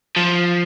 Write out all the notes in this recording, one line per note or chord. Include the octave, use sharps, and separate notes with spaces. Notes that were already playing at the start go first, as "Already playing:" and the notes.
F3